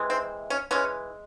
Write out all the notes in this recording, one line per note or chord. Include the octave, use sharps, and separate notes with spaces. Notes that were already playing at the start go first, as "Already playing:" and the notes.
Already playing: C3 E3 G#3
C4
C#4
E3 G#3 C#4